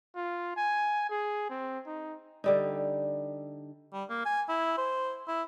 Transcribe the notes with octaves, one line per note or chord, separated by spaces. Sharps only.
F4
G#5
G#4
C4
D#4
D3 G3 D#4
G3
A#3
G#5
E4
C5
E4